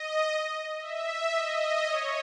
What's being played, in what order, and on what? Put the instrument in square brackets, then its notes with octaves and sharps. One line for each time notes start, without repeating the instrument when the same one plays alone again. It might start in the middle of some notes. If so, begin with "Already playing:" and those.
Already playing: [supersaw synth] D#5
E5
D#5
C#5